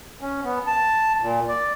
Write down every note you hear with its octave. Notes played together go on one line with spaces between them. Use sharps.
C#4
B3
A5
A#2
D5